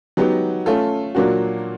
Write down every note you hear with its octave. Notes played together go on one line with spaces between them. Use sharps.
F#3 B3 D#4 G4
A3 C#4 F4 A4
A#2 F#3 A#3 D4 F#4